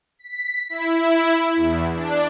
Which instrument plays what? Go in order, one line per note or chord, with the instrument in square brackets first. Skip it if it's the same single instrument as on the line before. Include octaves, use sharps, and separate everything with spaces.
[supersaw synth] B6
E4
E2
D4